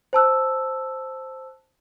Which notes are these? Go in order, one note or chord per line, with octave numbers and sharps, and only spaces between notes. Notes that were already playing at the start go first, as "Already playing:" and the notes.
C5 A5 E6 F#6